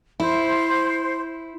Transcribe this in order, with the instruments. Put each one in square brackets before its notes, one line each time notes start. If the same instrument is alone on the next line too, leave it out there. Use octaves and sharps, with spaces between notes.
[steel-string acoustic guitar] E4 [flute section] C5